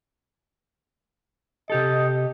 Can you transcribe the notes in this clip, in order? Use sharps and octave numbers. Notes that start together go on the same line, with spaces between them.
C3 G4 A4 D#5